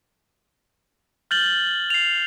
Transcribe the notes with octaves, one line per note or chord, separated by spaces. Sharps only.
F6 G6 A6 F#7 G7
C7 F7